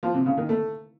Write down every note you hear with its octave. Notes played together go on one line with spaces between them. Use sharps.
F3
C3
C#3
D#3
A3